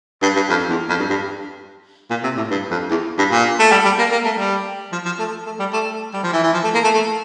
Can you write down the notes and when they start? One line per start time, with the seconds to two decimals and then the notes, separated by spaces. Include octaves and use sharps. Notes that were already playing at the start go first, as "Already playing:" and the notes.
0.22 G2
0.36 G2
0.49 F2
0.69 E2
0.89 F2
0.99 G2
1.10 G2
2.10 A#2
2.23 C3
2.37 A2
2.51 G2
2.71 F2
2.91 E2
3.18 G2
3.31 A#2
3.59 A3
3.72 G3
3.85 G3
3.99 A#3
4.12 A#3
4.25 A3
4.38 G3
4.92 F3
5.06 F3
5.19 A3
5.46 A3
5.59 G3
5.73 A3
5.93 A3
6.13 G3
6.23 F3
6.33 E3
6.43 E3
6.53 F3
6.64 A3
6.74 A#3
6.84 A3
6.94 A3